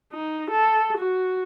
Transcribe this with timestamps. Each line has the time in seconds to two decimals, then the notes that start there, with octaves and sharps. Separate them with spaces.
0.13 D#4
0.51 A4
0.98 F#4